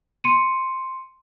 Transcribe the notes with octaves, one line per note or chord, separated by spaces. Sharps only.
C6 C#7 D#7